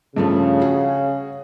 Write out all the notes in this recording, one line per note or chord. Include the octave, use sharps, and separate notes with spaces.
G2 C#3 F3 A3
F#4 G#4